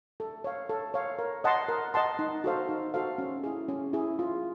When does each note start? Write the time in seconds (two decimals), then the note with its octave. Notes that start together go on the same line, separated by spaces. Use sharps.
0.20 A4
0.44 C#5 F5
0.69 A4
0.94 C#5 F5
1.19 A#4
1.44 D#5 F#5 A5 C6
1.68 A#4
1.94 D#5 F#5 A5 C6
2.19 D#4
2.44 F#4 A4 C5 F5
2.69 D#4
2.94 F#4 A4 C5 F5
3.18 C#4
3.44 E4 G#4
3.68 C#4
3.93 E4 G#4
4.19 F4